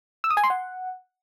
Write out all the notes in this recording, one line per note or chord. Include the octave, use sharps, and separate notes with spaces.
E6
D#6
G#5
C6
F#5